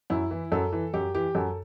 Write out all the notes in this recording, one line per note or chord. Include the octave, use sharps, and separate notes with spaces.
F#2 E4
E3
F#2 A4
E3
F#2 G4
E3 G4
F#2 A4